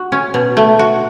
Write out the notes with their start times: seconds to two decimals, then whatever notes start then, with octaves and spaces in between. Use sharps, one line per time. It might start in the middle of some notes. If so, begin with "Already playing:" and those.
Already playing: F#4
0.12 C#4
0.34 B2
0.57 A3
0.79 F#4